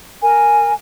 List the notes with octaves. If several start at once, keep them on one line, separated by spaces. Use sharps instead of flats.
A#4 G#5